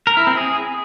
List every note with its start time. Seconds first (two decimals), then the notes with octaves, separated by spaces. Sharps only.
0.07 A#4
0.17 E4
0.27 C4
0.37 G#4